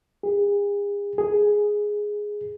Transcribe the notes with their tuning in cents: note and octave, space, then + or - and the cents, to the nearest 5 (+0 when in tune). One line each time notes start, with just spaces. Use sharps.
G#4 -40
G#4 +0